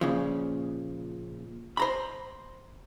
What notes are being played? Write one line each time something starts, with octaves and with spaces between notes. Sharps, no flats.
A#2 C#3 F3
C5 A#5 B5